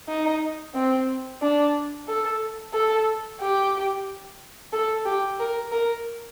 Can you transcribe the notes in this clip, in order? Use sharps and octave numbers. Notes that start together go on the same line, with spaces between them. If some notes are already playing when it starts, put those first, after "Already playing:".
D#4
C4
D4
A4
A4
G4
A4
G4
A#4
A#4